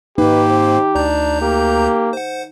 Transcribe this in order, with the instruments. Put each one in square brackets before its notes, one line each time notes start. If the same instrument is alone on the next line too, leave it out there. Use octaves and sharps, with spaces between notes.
[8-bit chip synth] G#2 A#3 [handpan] D#4 [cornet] G4 [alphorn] B4
[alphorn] C4
[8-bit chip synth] D2 A#5 G6 [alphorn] D4
[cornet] A#3 [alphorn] G4
[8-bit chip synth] C5 F#5